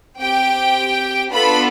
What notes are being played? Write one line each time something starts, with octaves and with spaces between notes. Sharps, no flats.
C4 G4 G5
B3 D4 F4 A4 B5